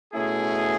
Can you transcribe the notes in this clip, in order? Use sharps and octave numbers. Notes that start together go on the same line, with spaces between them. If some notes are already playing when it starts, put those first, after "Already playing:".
B2 A3 C#4 E4 G#4